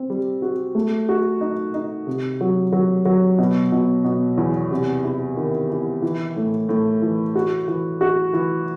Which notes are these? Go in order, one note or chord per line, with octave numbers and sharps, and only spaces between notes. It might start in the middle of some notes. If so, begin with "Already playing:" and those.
Already playing: C4
G3
F#4
A3
F#4
D#4
D#4
C3
F#3
F#3
F#3
B2
B2
B2
E2
C3
E4
D#3
E4
E3
A2
A2
E3
F#4
E3
F#4
E3